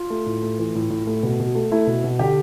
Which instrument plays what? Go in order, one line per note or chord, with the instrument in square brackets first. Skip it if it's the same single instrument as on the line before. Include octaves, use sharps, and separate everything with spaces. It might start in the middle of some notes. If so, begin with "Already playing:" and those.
Already playing: [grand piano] F4
A3
A2
A3
E3
A2
A2
A3
B2
B2
A3
A3 E4
B2
B2
D3 G4